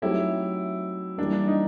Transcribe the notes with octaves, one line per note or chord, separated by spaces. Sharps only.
F#3 A3 C4 D#4 E4 G4
E3 G3 A#3 D4
D4
D#4